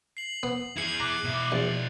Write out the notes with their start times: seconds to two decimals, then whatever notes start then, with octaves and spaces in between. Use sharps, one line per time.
0.17 C7 F#7
0.43 B3
0.77 E4 G#4 C7 C#7 F#7
1.00 A#5 D6 F#6
1.24 B2 E4
1.52 A#1 D5